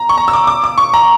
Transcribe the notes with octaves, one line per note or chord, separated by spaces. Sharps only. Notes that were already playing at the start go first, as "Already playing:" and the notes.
Already playing: A#5
C#6
A#5
E6
D6
D6
D6
C#6
A#5